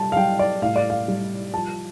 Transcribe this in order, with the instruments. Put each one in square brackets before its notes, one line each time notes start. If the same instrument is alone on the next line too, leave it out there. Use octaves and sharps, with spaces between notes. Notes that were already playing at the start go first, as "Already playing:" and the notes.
Already playing: [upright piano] G3 A5
F5
G3 G5
D5
A2 F5
D5
F5
G3
F3 A5